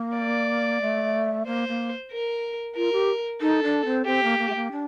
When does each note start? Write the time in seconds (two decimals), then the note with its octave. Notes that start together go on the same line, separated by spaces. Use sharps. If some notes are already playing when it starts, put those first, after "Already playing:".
Already playing: A#3
0.17 D5
0.82 A3
1.46 A#3 C5
1.69 A#3
2.12 A#4
2.76 F4 A#4
2.93 G4
3.41 D#4 A4
3.63 D4
3.85 C4
4.06 C4 G4
4.23 A#3
4.39 A#3
4.50 A3
4.56 A#3
4.72 D4